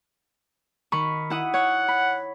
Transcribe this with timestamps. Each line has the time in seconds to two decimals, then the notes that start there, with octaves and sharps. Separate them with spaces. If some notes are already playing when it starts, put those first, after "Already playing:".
0.92 D#3 B5 C#6
1.30 E4 F#5 D#6
1.54 C#5 F#5
1.88 B5